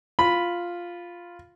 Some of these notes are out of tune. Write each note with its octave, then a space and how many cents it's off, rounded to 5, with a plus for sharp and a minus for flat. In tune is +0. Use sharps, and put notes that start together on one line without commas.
F4 +0 B5 +0